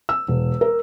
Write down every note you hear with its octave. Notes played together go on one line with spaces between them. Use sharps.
E6
E1
A#4